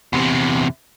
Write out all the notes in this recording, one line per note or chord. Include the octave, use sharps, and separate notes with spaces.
E2 C3